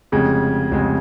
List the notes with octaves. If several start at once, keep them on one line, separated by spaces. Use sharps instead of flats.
F1 F2 C#3 G#3
F1 F2 C#3 G#3